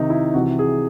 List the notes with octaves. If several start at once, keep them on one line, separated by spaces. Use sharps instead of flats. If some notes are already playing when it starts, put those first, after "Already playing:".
Already playing: C3 D#3 D#4
E4
C3 E3 F#4
G#4